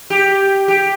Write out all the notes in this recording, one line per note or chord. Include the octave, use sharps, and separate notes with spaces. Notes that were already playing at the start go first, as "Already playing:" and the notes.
G4
G4